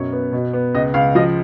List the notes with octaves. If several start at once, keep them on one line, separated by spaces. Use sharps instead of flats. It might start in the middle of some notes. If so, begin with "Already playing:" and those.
Already playing: F#2 B2 C#5
B3
B2
B3
C#2 D#5
C#2 F5
F3 D#5